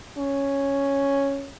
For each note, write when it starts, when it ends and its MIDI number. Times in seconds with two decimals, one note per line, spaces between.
0.18 1.50 61